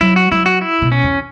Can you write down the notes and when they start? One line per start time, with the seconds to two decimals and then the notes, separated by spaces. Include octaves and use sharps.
0.01 F#3 E4
0.16 F#4
0.31 F#3 E4
0.46 F#4
0.61 E4
0.82 B2
0.92 C#4
1.03 E2